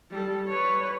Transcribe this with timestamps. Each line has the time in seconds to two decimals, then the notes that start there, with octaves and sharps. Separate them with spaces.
0.10 G3 A4
0.47 B4 C#5